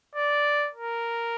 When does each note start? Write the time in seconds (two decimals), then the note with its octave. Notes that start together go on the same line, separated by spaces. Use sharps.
0.15 D5
0.74 A#4